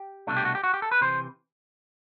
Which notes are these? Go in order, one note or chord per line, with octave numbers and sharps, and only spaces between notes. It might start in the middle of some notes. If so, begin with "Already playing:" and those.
Already playing: G4
C2 B2 A3 D4
G4
F#4
G4
F#4
G4
A4
B4
C3 E3 C5